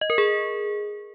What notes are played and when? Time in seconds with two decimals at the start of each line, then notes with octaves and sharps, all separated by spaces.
0.01 D#5
0.10 A#4
0.18 G#4